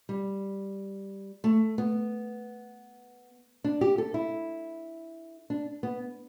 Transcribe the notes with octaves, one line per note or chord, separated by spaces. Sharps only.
G3
A3
B3
D4
G4
A4
E4
D4
B3